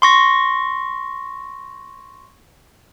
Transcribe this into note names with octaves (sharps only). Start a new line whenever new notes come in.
C6 C#6 A#6